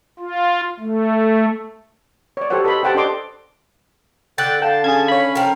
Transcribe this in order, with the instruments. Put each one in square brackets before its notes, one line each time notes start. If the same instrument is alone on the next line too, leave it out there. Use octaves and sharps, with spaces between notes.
[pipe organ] F4
A3
[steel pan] C#5 D5
F#4 G4 A4 C5 C#5 F#5
A4 B4 D#5 B5 C6
G4 C5 F#5 G5 A5
D4 A4 C5 D#5 C6 D6
[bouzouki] D3 [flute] A4 [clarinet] G5 [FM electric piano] F#6 A6
[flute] F5 [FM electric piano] G5 [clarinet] A5
[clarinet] C#4 [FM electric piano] G#4 A5 G#6
[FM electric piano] C#5 B5 [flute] F5
[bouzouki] F3 A#4 [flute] G5